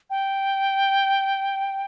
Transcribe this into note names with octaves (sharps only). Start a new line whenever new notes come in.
G5